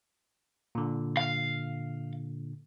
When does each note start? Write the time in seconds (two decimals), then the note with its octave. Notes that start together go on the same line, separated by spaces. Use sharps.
0.75 A#2 D3
1.17 F5